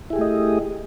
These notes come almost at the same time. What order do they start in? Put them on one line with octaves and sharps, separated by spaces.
E4 G#4 G4 A3 D#5